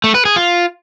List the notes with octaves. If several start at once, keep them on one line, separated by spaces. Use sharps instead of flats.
A3
B4
G#4
F4